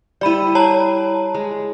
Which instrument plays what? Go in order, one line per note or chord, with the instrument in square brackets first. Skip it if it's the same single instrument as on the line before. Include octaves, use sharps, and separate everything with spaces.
[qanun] G3 E4 [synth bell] D5 B5 D#7
[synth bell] C#5 A5 A#5
[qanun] G#3